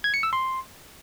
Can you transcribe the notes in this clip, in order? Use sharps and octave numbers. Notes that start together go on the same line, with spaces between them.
G#6
C#7
E6
C6